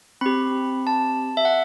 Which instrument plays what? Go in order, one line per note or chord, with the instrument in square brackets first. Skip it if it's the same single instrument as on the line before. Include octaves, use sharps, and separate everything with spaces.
[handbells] C4 G4 B5
A5
E5
F#5